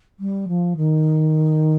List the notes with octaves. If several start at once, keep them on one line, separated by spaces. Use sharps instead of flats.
G3
F3
D#3